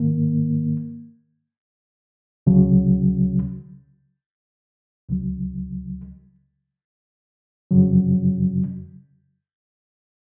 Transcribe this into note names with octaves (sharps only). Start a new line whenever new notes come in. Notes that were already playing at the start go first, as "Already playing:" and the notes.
Already playing: G#2 D#3 A#3
C#2 C#3 F#3
C#2 C#3 F#3
F2 C#3 F#3